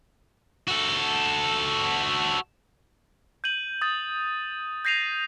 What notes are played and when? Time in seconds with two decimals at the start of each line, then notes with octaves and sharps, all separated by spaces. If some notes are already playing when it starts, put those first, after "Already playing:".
0.68 F#4 A4
3.44 G6 D#7 F#7
3.82 D#6 A6
4.85 G6 A#6 C7 D#7 F7